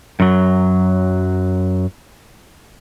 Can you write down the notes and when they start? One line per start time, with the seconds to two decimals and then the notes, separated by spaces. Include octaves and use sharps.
0.20 F#2 F#3